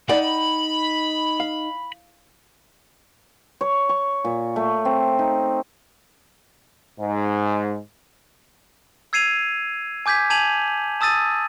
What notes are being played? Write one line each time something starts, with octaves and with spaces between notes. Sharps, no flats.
D#4 D5 F#5 G5 B5
F5
C#5
C#6
A#2
A3
C4
D#4
G#2
E6 G#6 C7 D#7 F7
G#5 D6 G6 G#6 B6
G#5 A5 G#6 D#7 F7 F#7
A5 D#6 E6 A6 D#7